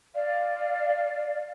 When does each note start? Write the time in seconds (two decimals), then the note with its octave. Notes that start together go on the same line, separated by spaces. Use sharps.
0.15 D5 F5